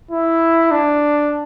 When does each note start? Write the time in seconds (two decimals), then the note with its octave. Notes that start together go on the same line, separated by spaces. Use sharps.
0.11 E4
0.71 D4